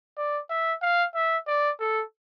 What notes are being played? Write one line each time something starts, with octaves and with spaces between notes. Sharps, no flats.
D5
E5
F5
E5
D5
A4